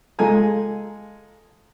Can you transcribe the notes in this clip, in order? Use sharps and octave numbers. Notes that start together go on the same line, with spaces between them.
G#3 F4 A4 G#5 A#5